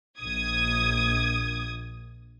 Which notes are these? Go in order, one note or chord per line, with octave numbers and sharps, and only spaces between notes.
A#1 D#6 G#6